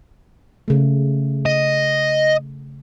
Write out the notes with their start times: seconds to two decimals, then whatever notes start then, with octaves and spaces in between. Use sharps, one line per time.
0.68 C#3 A3
1.46 D#5